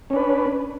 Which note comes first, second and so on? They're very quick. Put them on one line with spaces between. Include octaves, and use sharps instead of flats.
C#4 D4 B4